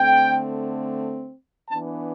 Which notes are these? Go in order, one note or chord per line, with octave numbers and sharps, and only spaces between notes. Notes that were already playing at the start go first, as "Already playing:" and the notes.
Already playing: D3 A3 C4 G5
E3 B3 D4 A5